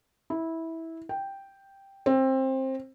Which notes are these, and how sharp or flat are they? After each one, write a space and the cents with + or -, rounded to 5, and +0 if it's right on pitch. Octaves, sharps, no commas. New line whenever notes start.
E4 -15
G5 +0
C4 +20